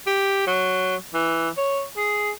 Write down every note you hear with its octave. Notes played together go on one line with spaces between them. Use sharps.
G4
F#3
E3
C#5
G#4